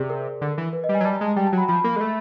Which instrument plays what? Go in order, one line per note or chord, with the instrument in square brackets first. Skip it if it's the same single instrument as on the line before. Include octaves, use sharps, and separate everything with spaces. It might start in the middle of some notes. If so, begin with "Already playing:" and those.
Already playing: [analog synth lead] C3 [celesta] G#4 D5
[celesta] A#4
[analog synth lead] D3
E3
[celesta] B4
D#5
[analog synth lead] G3
[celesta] G#5
[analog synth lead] F#3
[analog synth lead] G3 [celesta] A5
[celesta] A#5
[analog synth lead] G#3
[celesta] A5
[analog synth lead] G3 [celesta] G5
[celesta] A5
[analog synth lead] F#3 [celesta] B5
[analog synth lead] F3 [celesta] B5
[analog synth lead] A#3
G#3
A3